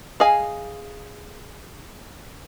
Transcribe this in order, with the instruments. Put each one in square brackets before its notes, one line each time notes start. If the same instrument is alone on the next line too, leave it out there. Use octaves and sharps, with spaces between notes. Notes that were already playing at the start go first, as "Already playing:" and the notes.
[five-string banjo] G#4 D#5 F5 G#5